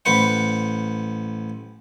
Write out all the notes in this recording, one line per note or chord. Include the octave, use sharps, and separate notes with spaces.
A1 B4 C5 F#5